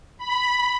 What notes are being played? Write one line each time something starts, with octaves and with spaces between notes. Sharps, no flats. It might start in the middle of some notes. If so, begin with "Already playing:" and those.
B5